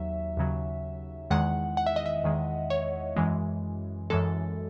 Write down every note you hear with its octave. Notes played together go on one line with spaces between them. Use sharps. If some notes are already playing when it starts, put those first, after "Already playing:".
Already playing: D#2 F#3 E5
D#2 C#3 F#3
E2 D#3 G#3 F#5
F#5
E5
D#5
E5
E2 D#3 G#3
C#5
F#2 E3 G#3
F#2 E3 G#3 A4